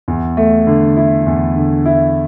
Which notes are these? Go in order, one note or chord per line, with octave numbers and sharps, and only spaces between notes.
E2
A3
D3
E4
E2
D3
E4